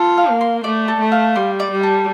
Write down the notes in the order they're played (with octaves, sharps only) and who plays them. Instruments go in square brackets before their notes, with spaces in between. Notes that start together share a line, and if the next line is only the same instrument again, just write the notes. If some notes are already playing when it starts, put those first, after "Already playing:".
Already playing: [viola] F4 [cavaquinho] A4
[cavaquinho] F5
[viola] A#3
[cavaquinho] C6
[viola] A3 [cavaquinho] D5
[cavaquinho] A4
[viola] A3
[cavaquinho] F5
[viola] G3 [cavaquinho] C6
[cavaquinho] D5
[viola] G3
[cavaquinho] A4